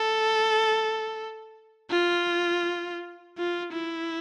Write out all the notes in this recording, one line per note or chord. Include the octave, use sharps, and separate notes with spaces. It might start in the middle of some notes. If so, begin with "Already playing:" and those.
Already playing: A4
F4
F4
E4